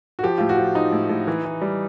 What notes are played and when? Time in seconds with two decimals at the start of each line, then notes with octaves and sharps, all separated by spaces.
0.19 F#4
0.23 F3 G4
0.38 A2 F4
0.49 F#4
0.58 F3
0.75 F3 D#4
0.93 A2
1.09 A2
1.27 E3
1.45 E3
1.61 G3